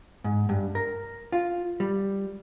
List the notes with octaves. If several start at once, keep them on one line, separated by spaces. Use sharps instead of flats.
G#2
G2
A#4
F4
G3